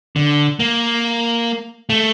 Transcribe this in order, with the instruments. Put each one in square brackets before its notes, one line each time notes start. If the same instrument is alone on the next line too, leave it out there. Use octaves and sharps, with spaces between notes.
[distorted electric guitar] D3
A#3
A3